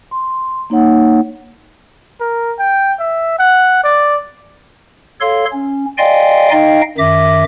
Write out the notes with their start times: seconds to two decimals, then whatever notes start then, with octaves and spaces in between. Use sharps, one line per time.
0.11 C6
0.70 A#3 D#4 C#5 F#5
2.21 A#4
2.59 G5
3.00 E5
3.39 F#5
3.84 D5
5.20 A4 C#5 F5 C6
5.52 C#4
5.98 D5 D#5 F5 G5 G#5 C6
6.51 D#4 D#5 F5 G5
6.98 F#2 D#3 E5 D6 A#6